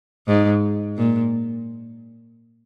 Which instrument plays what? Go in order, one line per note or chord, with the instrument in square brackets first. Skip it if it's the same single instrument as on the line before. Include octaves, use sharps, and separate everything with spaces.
[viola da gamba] G#2
A#2